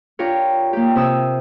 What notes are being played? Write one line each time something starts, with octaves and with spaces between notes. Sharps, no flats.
D4 F4 G4 A#4 C#5
A#3 G4
C3 C4 D#6 E6